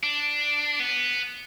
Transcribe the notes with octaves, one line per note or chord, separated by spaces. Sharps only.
D4
B3